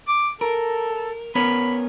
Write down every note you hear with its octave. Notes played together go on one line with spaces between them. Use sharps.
D6
A4 A#4
B3 C#4 A#4 B5